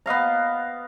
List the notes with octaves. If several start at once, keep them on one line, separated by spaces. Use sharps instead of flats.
B3 D#5 F5 A#5